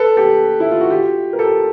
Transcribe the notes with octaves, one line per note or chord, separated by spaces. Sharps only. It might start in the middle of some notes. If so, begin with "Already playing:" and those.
Already playing: A4 B4
G4 A4
E4
F4
F#4
F4 G4
A#4
G4 A4